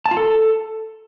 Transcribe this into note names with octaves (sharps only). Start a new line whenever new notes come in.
A5
F4
A4